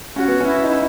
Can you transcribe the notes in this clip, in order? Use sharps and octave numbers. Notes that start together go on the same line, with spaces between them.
C#4 F#4
B3
C#4
E4
D#4